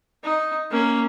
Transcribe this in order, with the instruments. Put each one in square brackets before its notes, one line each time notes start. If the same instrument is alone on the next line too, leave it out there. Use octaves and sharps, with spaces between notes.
[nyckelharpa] D#4
A#3 C#4